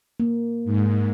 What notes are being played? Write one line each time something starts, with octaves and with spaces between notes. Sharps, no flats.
A#3
G#2